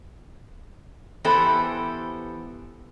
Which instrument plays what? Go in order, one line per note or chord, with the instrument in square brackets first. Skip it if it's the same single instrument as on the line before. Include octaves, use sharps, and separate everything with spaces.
[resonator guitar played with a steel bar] E3 B3 G4 A4 C5